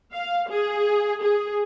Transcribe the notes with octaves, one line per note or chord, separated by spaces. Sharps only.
F5
G#4
G#4